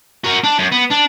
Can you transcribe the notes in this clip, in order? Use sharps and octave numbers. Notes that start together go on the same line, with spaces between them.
F#4 A#4
D4
F#2
B3
D4